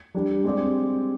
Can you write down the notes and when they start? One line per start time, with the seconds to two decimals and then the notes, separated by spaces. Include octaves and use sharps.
0.14 G3 D4 G4
0.44 G#3 C4 G4 D5